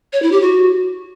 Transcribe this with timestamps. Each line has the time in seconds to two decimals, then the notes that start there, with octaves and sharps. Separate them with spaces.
0.13 C#5
0.22 E4
0.32 G4
0.42 F#4